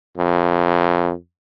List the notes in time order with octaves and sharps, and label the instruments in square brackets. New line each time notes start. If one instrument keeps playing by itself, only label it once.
[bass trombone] F2